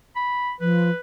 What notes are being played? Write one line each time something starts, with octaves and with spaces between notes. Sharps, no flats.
B5
F3 B4